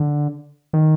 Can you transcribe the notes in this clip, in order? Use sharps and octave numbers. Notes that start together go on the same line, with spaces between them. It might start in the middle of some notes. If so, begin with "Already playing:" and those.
Already playing: D3
D#3